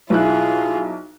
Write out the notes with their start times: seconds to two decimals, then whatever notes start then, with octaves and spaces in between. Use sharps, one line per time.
0.10 B1 E4 F4 G#4 F#6